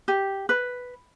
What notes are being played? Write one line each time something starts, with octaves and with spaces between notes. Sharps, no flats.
G4
B4